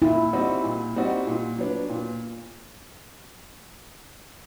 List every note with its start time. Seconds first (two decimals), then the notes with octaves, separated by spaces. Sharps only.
0.02 A#2 E4
0.33 G3 C4 D#4 F#4
0.64 A#2
0.96 G3 C4 D#4 F#4
1.27 A#2
1.59 F#3 B3 D4
1.89 A#2